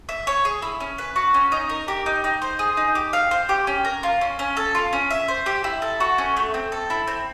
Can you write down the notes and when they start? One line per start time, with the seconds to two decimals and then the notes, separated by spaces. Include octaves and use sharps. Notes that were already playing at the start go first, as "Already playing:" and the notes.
0.09 E5
0.27 C#5
0.45 G#4
0.62 E4
0.80 C#4
0.98 B4
1.16 F#4
1.34 C#4
1.52 D#4
1.70 A#4
1.88 G4
2.06 D#4
2.24 D#4
2.42 C5
2.59 G#4
2.77 D#4
2.95 G4
3.13 F5
3.31 C5
3.49 G4
3.67 C#4
3.85 A#4
4.03 F4
4.21 C#4
4.39 C#4
4.57 A4
4.75 F4
4.93 C#4
5.10 E5
5.28 C5
5.46 G4
5.64 E4
5.82 A4
6.00 F#4
6.18 C#4
6.37 A3
6.54 C4
6.72 A4
6.90 E4
7.07 C4